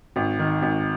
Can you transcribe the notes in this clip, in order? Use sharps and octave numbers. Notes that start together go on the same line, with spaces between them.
G#1
D#3
G#1